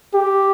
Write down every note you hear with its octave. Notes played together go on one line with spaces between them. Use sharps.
G4